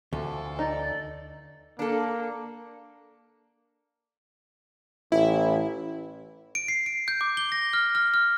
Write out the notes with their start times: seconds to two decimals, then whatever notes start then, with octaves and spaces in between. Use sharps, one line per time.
0.13 D2 E3 F3 A4
0.59 D#4 D5
1.79 A#3 D4 A4
5.12 A1 E4 E5
6.55 D7
6.68 C7
6.86 D7
7.08 G6
7.21 D6
7.37 G7
7.52 A#6
7.73 F6
7.95 F6
8.14 F6